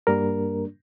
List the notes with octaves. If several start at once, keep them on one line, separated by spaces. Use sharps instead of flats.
G2 G3 A#3 D4 A#4